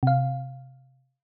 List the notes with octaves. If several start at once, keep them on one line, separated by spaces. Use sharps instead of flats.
C3 F5